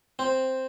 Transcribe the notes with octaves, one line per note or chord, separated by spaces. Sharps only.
C4